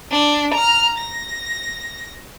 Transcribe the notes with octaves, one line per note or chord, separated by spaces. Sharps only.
D4
A#5 F6
A#6